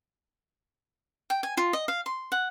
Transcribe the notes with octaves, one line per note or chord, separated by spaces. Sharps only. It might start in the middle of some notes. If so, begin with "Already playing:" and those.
G5
G#5
F4
D#5
F5
C6
F#5